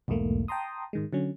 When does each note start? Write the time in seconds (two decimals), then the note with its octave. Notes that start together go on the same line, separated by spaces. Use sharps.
0.08 B1 E2 G#2 A3 A#3
0.48 G5 A5 A#5 C6 D#6
0.93 G#2 D#3 G#3
1.13 D3 F#3 C#4